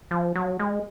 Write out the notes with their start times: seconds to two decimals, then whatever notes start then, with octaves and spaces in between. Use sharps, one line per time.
0.11 F3
0.35 F#3
0.59 G#3